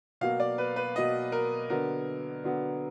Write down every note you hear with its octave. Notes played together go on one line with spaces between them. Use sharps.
B2 F#3 A#3 F5
D5
B4
B4
B2 F#3 A#3 D#5
A#4
D3 F#3 B3 A#4
D3 F#3 B3